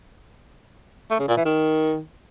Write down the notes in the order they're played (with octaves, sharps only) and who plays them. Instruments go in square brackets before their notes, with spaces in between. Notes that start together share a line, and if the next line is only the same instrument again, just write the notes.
[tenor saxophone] A3
C#3
A#2
E3
D#3